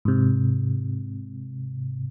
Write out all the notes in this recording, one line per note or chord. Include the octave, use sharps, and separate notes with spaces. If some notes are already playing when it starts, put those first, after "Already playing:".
G#2 C3